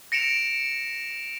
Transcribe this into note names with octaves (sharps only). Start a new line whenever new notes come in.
A#6 C#7 D7 E7 F7